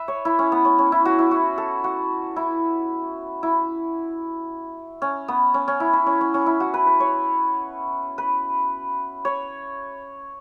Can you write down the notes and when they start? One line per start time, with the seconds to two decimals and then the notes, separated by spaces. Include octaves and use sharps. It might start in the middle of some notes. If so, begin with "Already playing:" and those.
Already playing: B4 E5
0.08 C#5
0.25 E4
0.39 C#4
0.52 B3
0.65 C#4
0.78 C#4
0.92 E4
1.05 F#4
1.19 E4
1.31 F#4
1.58 A4
1.84 F#4
2.36 E4
3.43 E4
5.02 C#4
5.28 B3
5.54 C#4
5.68 C#4
5.80 E4
5.93 E4
6.06 C#4
6.21 C#4
6.34 C#4
6.46 E4
6.60 F#4
6.74 B4
6.87 B4
7.00 C#5
8.18 B4
9.25 C#5